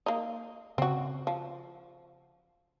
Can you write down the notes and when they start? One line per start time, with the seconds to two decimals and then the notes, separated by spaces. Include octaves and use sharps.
0.06 A#3 D#4
0.78 C#3 C4 F#4
1.27 F3